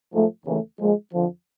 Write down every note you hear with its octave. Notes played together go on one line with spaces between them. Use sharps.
G#2 F3 A3
D#2 C#3 E3 A3
A#2 F3 G#3
F2 D3 F3